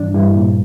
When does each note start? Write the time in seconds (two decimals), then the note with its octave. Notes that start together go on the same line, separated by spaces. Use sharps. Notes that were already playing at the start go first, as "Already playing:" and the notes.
Already playing: G2 E3 D4
0.14 G2 E4
0.36 A#2